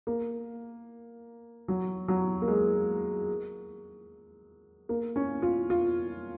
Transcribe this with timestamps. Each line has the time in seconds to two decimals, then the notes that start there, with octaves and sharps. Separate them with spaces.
0.07 A#3
1.68 F#3
2.08 F#3
2.42 A#3
2.48 G#3
4.89 A#3
5.16 C#4
5.42 F4
5.70 F4